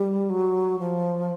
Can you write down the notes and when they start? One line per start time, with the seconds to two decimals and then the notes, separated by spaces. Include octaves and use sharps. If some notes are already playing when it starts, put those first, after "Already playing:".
Already playing: G3
0.30 F#3
0.79 F3